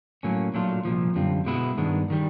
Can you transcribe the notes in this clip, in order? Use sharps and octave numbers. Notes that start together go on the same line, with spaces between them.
A2 F#3 A#3 C#4
A#2 F#3 A3 D4 F4
C2 A#2 F3
F#2 D3 G3 C4 F4
B2 G#3 B3 E4
G2 D#3 G#3 B3 D4
D#3 G3